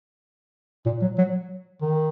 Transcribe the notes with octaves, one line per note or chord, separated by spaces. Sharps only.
A#2
F#3
F#3
D#3